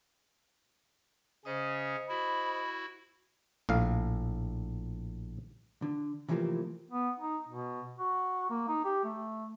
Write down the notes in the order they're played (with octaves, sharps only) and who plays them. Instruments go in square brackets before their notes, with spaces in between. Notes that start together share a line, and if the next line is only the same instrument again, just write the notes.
[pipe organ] C#3 C#4 [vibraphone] C5 D#5 D#6
[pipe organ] E4 F#4 [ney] B5
[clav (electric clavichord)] A#1 A2 F5
[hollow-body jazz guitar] D3
C3 E3 F3 A3 A#3 C4
[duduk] B3
D#4
B2
F#4
A#3
D#4
G4
A3